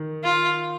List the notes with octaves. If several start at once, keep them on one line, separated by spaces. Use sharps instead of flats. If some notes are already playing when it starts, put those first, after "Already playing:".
Already playing: D#3
F4